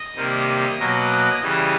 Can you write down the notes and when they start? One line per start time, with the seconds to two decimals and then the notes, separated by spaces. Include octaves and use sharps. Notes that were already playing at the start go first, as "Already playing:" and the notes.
Already playing: D#5
0.16 C3 D#3 G3 A#3
0.48 D#5
0.79 B2 F#3 A#3 D#5
1.41 C#3 E3 G3 D#5